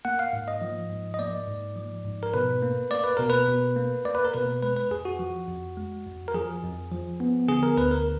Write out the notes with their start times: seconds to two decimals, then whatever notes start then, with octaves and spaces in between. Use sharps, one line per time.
0.05 A#3 F#5
0.19 F5
0.33 G#2
0.48 D#5
0.62 F3
0.90 G#2
1.14 D#5
1.19 A#3 D5
1.47 G#2
1.76 F3
2.05 G#2
2.23 A#4
2.34 B2 B4
2.62 A#3
2.91 A#3 D5
3.04 B4
3.17 B2 A#4
3.30 B4
3.48 B2
3.76 A#3
4.05 A#3 D5
4.15 B4
4.24 A#4
4.34 B2 B4
4.62 G#3 B4
4.76 B4
4.91 F2 G#4
5.05 F#4
5.19 F3
5.48 F2
5.77 G#3
6.06 F2
6.28 A#4
6.34 F3 G#4
6.63 F2
6.91 F3
7.20 B3
7.48 D3 G#4
7.63 A#4
7.77 D2 B4
7.91 A#4